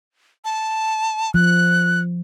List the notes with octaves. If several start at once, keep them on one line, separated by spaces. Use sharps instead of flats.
A5
F3 F#6